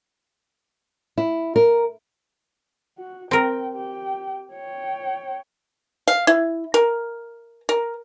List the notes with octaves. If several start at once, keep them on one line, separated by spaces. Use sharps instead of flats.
E4
A#4
F#4
C4 A#4 G5
G4 G5
C#5 G5
F5
E4
A#4
A#4